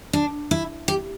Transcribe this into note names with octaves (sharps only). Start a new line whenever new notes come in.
D4
E4
G4